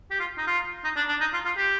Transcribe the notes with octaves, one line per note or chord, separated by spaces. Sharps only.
G4
F4
D#4
F4
D#4
D4
D4
D#4
F4
F4
G4